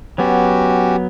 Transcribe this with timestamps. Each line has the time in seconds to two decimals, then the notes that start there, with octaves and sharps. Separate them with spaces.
0.18 F#3 B3 C#4 F#4 G4